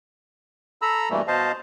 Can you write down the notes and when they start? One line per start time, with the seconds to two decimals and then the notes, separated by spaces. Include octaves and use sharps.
0.82 A4 A#5 B5 E6
1.10 G2 B2 E3 G3 A3 A#3
1.28 B2 C5 D#5 F5 A5